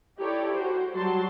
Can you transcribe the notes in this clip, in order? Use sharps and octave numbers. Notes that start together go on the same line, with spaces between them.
D#4 E4 G4 A4 C#5 D5
F#4 C5
F#3 G3 F#4 A5 C6